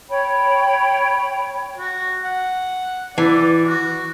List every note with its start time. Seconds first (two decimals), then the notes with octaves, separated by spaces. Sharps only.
0.09 C#5 G5 B5
1.78 F#4
2.24 F#5
3.18 E3 D5
3.66 F#4